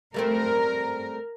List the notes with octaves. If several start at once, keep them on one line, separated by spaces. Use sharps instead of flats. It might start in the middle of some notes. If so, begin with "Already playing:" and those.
G3 A3 C4 A#4